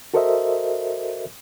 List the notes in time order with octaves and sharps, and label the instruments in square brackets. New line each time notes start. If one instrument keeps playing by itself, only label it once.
[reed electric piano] F#4 A4 A#4 C5 D#5 E5